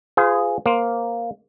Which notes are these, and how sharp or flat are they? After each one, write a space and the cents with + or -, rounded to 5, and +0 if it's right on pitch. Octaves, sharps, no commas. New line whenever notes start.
F4 +0 G#4 +0 C5 -45
A#3 +0 C5 +0